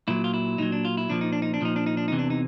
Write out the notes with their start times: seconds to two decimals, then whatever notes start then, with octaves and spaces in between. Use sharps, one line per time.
0.08 A#2 F#3 E4
0.24 F4
0.34 E4
0.58 A#2 F#3 D#4
0.72 D4
0.85 F4
0.97 E4
1.10 A#2 F3 D4
1.21 D#4
1.32 D4
1.42 D#4
1.54 D4
1.61 A#2 F3 D#4
1.76 D4
1.86 D#4
1.97 D4
2.08 E2 C3 E3 D#4
2.19 D4
2.30 D#4